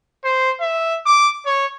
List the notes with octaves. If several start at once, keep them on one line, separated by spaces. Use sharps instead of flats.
C5
E5
D6
C#5